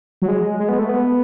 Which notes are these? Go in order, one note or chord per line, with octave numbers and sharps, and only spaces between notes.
F#3
G#3
G#3
B3
A3
B3